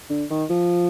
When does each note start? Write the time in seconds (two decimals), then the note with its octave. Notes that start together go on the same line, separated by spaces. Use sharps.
0.10 D3
0.30 D#3
0.50 F3